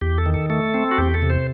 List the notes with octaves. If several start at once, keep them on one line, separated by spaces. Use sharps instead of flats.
E2 G4
A4
D#3
A4
A3 A4
C4
F#4
E2 G4
A4
C3
C5